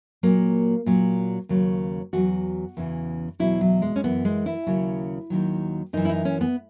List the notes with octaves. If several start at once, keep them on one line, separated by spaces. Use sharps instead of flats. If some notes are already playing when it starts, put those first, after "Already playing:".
A#2 F#3 A#3
A#2 F#3
D#2 C#3 F#3
E2 D#3 F#3 F#4
E2 C#3 E3
E2 B2 F#3 E4
F#3
G#3
C#4
F#2 E3 B3
G#3
E4
D#2 C#3 F#3
D#2 D#3 F#3
F#2 E3 D#4
E4
D#4
C#4
B3